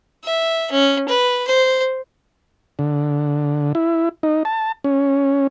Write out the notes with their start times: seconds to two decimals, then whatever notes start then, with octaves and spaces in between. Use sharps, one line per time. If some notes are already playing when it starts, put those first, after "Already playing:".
0.24 E5
0.71 C#4
1.08 B4
1.47 C5
2.79 D3
3.75 E4
4.23 D#4
4.45 A5
4.84 C#4